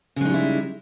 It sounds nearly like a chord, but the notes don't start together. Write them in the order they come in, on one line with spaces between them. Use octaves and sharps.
C#3 G#3 D#4 G3 E4